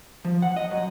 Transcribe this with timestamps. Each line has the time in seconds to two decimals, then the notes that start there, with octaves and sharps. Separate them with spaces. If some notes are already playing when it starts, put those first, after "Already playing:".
0.25 F3
0.42 F#5
0.56 D#5
0.71 F#2